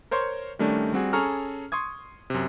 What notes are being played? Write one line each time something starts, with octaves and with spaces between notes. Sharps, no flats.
A#4 C5 C#5 C6 C#6
D#3 G3 A3 C#4 D4
G3 C4 F#4 G#4
C#4 G#4 A4 A#5 C#6 F6
C6 C#6 D#6 G#6
F#2 C3